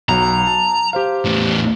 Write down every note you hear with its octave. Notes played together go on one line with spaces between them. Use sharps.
B1 F#3 A#5
A5
G4 C5 F5
E2 A2